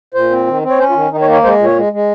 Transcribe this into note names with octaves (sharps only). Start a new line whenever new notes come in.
A#2 C5
C4
D#3
C4
C#5
C#4 C5
F4
D#3
D#3 D#4
C#5
A#3
C#5
G#3 C5
A#2
C#5
G#3
G#3